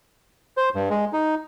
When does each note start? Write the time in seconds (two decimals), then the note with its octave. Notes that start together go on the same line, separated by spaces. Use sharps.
0.57 C5
0.75 G2
0.90 G#3
1.13 D#4